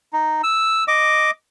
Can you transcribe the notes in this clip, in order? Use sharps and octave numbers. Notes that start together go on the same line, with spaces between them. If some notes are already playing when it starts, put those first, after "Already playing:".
D#4
E6
D#5 D6